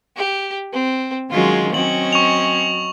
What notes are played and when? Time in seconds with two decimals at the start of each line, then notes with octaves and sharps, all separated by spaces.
0.16 G4
0.73 C4
1.31 D#3 F#3 G#3 C#4 F4
1.74 F#3 C4 C#4 D#5 F#7
2.13 C#6 F7